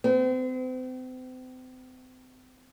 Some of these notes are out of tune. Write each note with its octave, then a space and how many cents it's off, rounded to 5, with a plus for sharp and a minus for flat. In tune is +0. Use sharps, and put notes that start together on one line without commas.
C4 -40